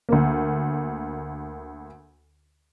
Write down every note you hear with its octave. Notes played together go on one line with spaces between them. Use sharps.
D2 A#3